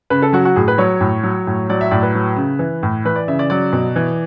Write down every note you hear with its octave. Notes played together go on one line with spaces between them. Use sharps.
C#3 B4
A4
F#3 F#4
F#4
A2 G#4
B4
F#3 C#5
A2
F#3
A2
F#3 D5
E5
A2 D5
B4
F#3
C#3
E3
A2
E3 B4
D5
C#3 E5
D5
F#3 D5
B2
E3